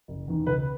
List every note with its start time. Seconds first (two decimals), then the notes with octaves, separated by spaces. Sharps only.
0.08 F#1
0.28 E2 D#3
0.47 C#2 B4